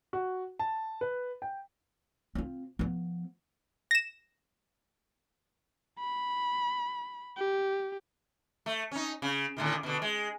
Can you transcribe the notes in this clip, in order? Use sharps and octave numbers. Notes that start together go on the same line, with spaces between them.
F#4
A5
B4
G5
C4 F4
F3 B3
A#6 E7
B5
G4
A3
C#4 D#4
C#3
A2 D3 D#3
B2 D3
G#3